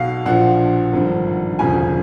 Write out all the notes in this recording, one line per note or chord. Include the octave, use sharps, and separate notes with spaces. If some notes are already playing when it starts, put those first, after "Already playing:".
Already playing: B1 B2 F5 F#5
A#1 A#2 F3 F#5
G#1 G2 D3 F3
E1 D2 C#3 F3 G#5